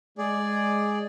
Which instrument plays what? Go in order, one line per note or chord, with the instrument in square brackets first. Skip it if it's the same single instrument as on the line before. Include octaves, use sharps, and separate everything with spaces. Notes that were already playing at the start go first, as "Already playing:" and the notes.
[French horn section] G#3 [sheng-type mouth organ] G#4 D5